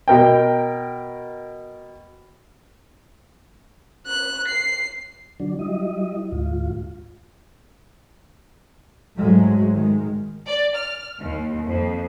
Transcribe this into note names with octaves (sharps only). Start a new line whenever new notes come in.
B2 A#4 G5
F#6
C7
D3 F#3 D4
F#3 G3 E4 D#5
D2 G#2 F4
G#2 F#3 G#3 A3
D#3 G#3
D5
F6
D#2
F2